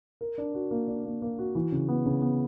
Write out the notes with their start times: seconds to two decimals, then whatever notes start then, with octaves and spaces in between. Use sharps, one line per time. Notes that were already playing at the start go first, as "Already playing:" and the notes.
0.21 A#4
0.38 D4
0.54 F#4
0.71 A#3
0.88 D4
1.05 A#3
1.22 A#3
1.39 F#4
1.55 E3
1.72 C#3
1.88 B3
2.06 C#3
2.22 B3